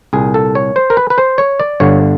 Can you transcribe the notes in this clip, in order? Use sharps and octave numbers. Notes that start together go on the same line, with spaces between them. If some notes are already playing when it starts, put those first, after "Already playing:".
C2 A#2 G#4
A4
C#5
C5
A#4
B4
B4
C5
C#5
D5
G1 G2 D3 C#5